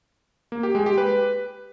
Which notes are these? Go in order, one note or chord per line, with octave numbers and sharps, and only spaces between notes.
A#3
G4
G#3
G4
B4